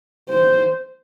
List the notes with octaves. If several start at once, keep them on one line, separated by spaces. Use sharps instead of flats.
C5